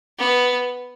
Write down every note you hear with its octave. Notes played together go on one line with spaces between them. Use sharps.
B3